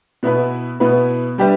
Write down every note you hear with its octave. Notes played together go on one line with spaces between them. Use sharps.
B2 B3 E4 B4
B2 B3 E4 B4
G3 D4 G4 B4 E5